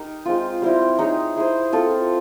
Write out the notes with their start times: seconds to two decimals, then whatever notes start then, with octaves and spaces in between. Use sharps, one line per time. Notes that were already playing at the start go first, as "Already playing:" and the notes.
Already playing: D#4 G4 A#4
0.25 G#3 C4 F4
0.62 G3 C4 E4 G4
0.99 D#4 G#4 C#5
1.35 E4 G#4 C5
1.72 C4 F4 A4